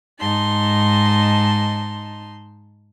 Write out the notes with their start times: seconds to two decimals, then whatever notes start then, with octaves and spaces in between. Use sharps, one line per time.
0.20 G#2 D#4 A5 C6